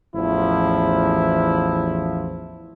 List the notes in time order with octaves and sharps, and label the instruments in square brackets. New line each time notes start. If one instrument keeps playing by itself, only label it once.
[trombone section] A1 E2 F3 E4